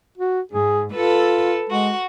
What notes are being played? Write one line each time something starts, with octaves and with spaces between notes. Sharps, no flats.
F#4
G#2 G#4
F4 A4 B4
G#3 F#4